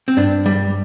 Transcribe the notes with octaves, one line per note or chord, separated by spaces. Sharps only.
C4
G2 D4
G3